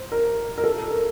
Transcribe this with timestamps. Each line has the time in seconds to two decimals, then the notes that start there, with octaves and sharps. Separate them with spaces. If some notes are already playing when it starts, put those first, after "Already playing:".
Already playing: C5
0.12 A#4
0.58 A#4
0.64 A4
0.91 A#4